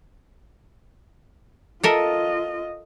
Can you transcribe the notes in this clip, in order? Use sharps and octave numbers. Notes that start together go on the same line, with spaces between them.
F4 A4 A#4 D#5 E5